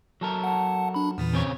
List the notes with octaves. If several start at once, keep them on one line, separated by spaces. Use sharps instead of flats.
F#3 A4 A#4
F#5 A5
D4 B5
E2 A#2 E3
C#3 C4 C#5